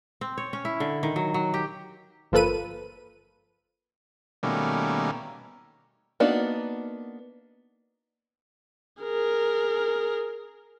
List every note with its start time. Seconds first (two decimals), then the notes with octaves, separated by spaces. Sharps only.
0.21 C4
0.38 C#5
0.53 C#4
0.65 E4
0.80 D3
1.03 D#3
1.16 F#3
1.34 F#3
1.54 G4
2.32 G1 F3 A#3 A4 B4 D#7
4.43 B2 D#3 G3 A3 A#3 C#4
6.20 A#3 B3 D4 D#4 F#4
9.03 G#4 A#4